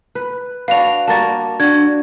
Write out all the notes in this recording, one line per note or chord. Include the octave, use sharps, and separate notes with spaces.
B4
D4 F#4 B4 F5 F7
G3 A#3 F#4 A5 A6
D4 F#4 G#6